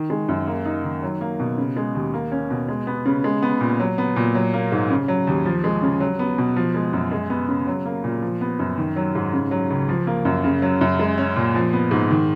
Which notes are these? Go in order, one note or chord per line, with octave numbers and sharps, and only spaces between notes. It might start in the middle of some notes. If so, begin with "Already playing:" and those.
Already playing: D#3
G#3
F#2
A#3
D#4
D#3
F#3
A#3
B2
C#3
G#3
D#2
A#3
C#4
B2
G#3
B3
C#3
G#3
B3
A#2
F#3
B3
A#2
F#3
A#3
G#2
C#3
F#3
D#2
F3
G#3
C#3
F#3
B3
B2
F3
G#3
F#2
G#3
B3
C#3
F#3
A#3
A#2
F3
B3
F#2
D#3
F#3
G#2
C#3
F#3
C#2
F3
A#3
F#2
C#3
F#3
F#2
G#3
C#4
A#2
F3
B3
G#2
D#3